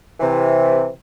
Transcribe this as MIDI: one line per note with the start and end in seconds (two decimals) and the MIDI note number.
0.20 0.87 48
0.20 0.87 52